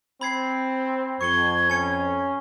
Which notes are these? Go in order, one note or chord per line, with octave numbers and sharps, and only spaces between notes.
C4 B5 G#6 C7
F2 C#6 G#6 C#7 G7
C#4 G#5 C#7